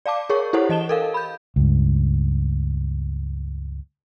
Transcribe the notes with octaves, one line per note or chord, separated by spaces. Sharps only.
D5 F5 A5 D6
G#4 A#4 C#5 C#6
E4 G4 A4 C5 C#5 F#5
E3 D#5 A5 E7 G7
A4 A#4 F5
B5 G6
C#2 G2